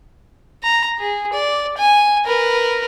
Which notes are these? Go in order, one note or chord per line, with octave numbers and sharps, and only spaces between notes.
A#5
G#4
D5
G#5
A#4 B4